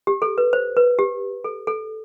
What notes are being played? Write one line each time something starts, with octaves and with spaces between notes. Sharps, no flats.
G4
A4
B4
C5
B4
G4
A4
A4